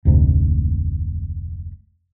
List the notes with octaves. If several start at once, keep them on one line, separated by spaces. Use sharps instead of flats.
F1 D2 G#2 C3